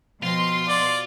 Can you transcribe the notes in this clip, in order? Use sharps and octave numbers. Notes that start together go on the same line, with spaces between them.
B2 F3 F4 G5 C6 A#6
F#4 D5